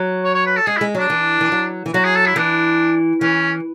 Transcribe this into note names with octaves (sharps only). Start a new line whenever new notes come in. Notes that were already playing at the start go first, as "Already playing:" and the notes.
Already playing: F#3
C#5
C#5
B4
A4
G#3 G#4
E4
G#3
F#3 D4
E3
E3
F#3
E3
F#3 F#4
G#4
A4
E4
E3 D4
E3 C#4